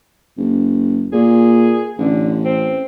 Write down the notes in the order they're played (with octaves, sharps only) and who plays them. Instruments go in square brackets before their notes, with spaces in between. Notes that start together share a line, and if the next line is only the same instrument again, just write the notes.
[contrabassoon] F#1
[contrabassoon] A#2 [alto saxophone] G#4
[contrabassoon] A1 [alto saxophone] D3
[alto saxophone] C4